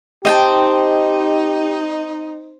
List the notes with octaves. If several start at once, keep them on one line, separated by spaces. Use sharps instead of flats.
C4 D#4 G4 D#5 G5 A5